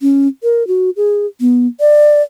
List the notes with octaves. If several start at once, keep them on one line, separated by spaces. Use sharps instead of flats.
C#4
A#4
F#4
G#4
B3
D5